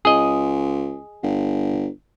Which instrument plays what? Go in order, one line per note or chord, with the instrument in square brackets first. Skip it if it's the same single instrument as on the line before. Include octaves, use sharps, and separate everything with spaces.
[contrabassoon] C#2 [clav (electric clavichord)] G#4 D#5
[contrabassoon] G1